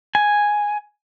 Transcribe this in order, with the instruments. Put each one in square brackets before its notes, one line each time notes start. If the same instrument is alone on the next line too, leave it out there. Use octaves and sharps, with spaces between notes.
[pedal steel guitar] G#5